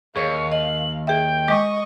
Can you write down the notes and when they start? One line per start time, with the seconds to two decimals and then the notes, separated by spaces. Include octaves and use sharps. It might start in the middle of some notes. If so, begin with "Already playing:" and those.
0.16 D#2 G#4 C#5 F5 C#6
0.52 D#5 F#7
1.07 G#4 E5 G5
1.48 G#3 D#5 C#6 D6